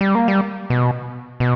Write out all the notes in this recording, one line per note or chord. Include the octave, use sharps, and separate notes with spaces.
G3
A#3
G3
B2
B2